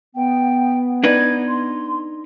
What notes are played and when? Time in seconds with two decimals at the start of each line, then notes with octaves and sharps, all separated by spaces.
0.16 B3 G5
1.04 D4 D#4 B4 G#6
1.48 C6